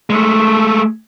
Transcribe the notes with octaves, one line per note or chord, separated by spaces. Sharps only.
G#3 A3